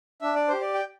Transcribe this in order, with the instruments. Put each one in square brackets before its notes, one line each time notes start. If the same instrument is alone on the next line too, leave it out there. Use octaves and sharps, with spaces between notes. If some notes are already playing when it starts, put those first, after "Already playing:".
[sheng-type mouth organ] D4 E5
D5
G4 C5
D5
G5